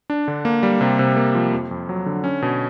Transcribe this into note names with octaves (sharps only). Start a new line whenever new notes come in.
D4
D3
A#3
G3
C3
C3
A#3
F3
F2
F2
F#3
D3
C#4
B2